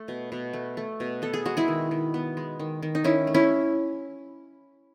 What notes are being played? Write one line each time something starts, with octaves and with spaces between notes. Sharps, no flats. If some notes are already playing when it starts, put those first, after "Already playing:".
Already playing: A3
B2
B2
A3
A3
B2
B3 A4
G#4
G#3 F#4
E4 G#4
D#3
D#3
B3
G#3
D#3
D#3
D#4
D#3 C#4 E4
A3
C#4 E4